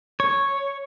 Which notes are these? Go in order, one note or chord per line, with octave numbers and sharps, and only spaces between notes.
C#5